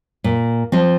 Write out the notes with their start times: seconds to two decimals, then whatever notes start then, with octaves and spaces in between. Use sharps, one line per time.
0.24 A#2
0.72 F3 C4